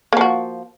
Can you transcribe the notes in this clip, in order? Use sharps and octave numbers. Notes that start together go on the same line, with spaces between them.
F3 A#3 F#4